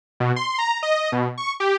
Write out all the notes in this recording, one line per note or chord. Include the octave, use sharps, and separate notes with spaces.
B2
C6
A#5
D#5
B2
C#6
G4